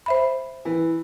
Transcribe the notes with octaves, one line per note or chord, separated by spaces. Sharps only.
C5 E5 B5
E3